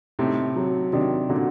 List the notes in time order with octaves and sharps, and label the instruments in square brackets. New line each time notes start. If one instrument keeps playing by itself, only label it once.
[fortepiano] A2 C3 [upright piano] D#4
[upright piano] F#3
[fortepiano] C3 D#3 [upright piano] D4
[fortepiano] A#2 D3 [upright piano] F#4